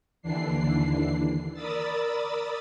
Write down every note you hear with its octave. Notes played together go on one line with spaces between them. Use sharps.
D#2 D3 E3 D4 C7
A#4 D5 B5 D#6 E6 A6